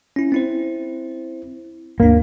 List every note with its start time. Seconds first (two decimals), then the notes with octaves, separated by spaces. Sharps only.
0.16 C#4 E4
0.32 C4 E4 C5
2.00 D#2 G#2 A#3 D4